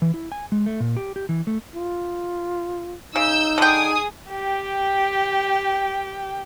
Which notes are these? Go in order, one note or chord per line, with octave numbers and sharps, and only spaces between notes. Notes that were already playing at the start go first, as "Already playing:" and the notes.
E3
E4
G#5
G#3
A3
A#2
G4
G4
E3
A3
F4
C#3 D#4 E6 G6
D3 G#4 G5 G#5 D#6
G4 G5